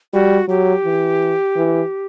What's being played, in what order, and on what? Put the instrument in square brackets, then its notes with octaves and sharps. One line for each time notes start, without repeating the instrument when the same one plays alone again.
[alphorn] G3 [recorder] F#4
[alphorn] F#3 [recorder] G4
[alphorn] E3
E3